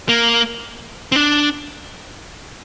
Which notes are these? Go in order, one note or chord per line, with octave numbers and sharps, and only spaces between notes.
A#3
C4
D4